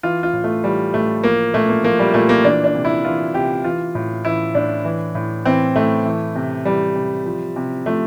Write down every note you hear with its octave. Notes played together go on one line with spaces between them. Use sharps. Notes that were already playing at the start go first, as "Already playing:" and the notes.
E3 F4
F4
A2
A3
E3 G3
A2 A3
F3 A#3
A#2 A3
A#3
F3 A#3
G3
A#2 A3
A#3
E3 D4
D4
C3
E4
E3 F4
C3 G4
E3 F4
A2
E3 E4
A2 D4
E3
A2
E3 C4
A2 A3
E3
C3
E3 G3
C3
F3
C3
F3 A3